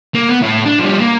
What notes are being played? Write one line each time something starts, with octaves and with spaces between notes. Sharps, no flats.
A#3
B3
A2
D4
F3 G3
A#3